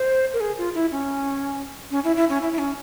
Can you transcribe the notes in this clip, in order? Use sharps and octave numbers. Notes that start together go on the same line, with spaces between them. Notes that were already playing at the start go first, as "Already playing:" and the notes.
Already playing: C5
A#4
G#4
F4
E4
C#4
C#4
E4
E4
C#4
E4
E4
C#4